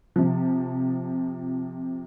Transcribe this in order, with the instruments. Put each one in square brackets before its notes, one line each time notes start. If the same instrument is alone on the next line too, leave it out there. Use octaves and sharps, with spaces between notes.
[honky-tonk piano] C3 F3